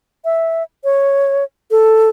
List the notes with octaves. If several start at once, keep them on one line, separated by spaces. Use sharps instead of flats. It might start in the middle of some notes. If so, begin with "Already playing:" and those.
E5
C#5
A4